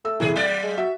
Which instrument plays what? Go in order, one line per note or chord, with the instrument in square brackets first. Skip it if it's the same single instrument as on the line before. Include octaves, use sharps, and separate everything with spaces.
[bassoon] A3 [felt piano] E6
[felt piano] F1 E3 [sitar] D#2 G#4
[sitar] F#3 G3 D5 [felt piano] A6
[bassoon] G#3
[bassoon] F#4 [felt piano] E5